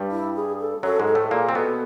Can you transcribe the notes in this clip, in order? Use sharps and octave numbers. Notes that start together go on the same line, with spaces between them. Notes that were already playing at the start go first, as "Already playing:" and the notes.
Already playing: G2 G3
E4
G#4
A4
F#2 F#3 A4
G#2 G#3
A4
A2 A3
A#2 A#3 G#4
C4
B2 B3 A4